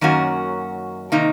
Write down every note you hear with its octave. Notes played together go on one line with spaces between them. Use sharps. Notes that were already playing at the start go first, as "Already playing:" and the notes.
F#2 D#3 A#3 C#4 F#4
C3 D#3 A#3 D#4